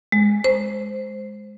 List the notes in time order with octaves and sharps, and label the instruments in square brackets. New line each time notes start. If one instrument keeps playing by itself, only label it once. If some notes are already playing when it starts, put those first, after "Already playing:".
[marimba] G#3
C5